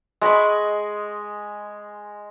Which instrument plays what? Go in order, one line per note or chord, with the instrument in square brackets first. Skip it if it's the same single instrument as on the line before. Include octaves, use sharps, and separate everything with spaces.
[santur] G#3 D#5 B5 C#6